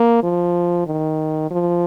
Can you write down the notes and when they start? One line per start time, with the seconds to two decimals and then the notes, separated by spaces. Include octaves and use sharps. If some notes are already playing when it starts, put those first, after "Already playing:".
Already playing: A#3
0.23 F3
0.87 D#3
1.51 F3